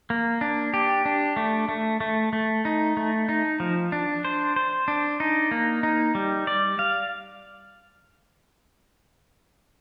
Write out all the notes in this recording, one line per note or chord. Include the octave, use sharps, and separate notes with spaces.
A#3
D4
G4
D4
A3
A3
A3
A3
D#4
A3
D#4
F3
D4
C5
C5
D4
D#4
A#3
D#4
G3
D5
F5